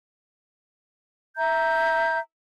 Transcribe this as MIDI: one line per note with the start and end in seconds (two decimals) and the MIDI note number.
1.37 2.19 76
1.37 2.19 82
1.37 2.19 91